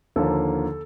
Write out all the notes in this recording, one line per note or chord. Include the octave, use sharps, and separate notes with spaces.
D#2 D3 F3 A#3 A4